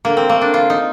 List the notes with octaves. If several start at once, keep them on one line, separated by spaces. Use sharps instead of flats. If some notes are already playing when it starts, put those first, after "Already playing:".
D3 A#3
C4
A3 A#3
D4
D3 F4
D#4